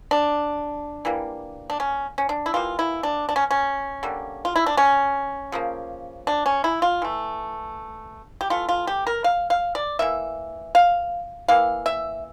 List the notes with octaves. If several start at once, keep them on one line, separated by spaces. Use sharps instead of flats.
D4
E3 G3 A#3
D4
C#4
C#4
D4
E4
E3 G3 A#3 F4
E4
D4
D4
C#4
C#4
D3 G3 A#3
F4
E4
D4
C#4
C#3 F3 A#3
D4
C#4
E4
F4
E3 A3
G4
E3 A3 F4
F4
G4
A#4
F5
F5
D5
E3 A#3 E5
F5
E3 A#3 F5
E5